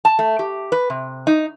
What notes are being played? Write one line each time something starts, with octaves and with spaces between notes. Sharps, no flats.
A5
A3
G4
B4
C3
D#4